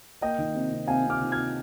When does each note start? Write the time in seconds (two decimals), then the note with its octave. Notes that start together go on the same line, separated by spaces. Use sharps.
0.21 A#3 D#5 G5
0.38 D#3
0.55 C3
0.71 C3
0.87 C3 F5 G#5
1.05 C3 D6 F6
1.21 D#3
1.32 F6 G#6
1.37 C3